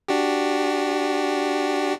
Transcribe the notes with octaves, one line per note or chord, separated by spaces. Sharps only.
D4 F#4 G4